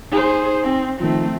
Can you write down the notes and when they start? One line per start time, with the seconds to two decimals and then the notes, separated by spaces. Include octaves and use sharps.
0.12 D#4 G#4 C5
0.63 C4
1.00 D#3 F3 A3 C4